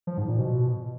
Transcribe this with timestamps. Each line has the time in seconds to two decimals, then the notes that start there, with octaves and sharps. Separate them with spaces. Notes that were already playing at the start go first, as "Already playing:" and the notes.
0.07 F3
0.18 G#2
0.28 A#2
0.39 B2